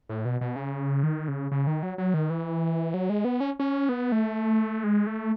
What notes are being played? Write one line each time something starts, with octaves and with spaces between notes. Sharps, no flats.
A2
B2
B2
C#3
D#3
C#3
C#3
D#3
F#3
F#3
D#3
E3
F#3
G#3
B3
C#4
C#4
B3
A3
G#3
A3